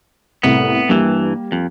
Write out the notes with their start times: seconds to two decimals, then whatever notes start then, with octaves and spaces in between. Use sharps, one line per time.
0.43 C2 A2 B3
0.89 G2 E3 G3 A#3
1.52 F2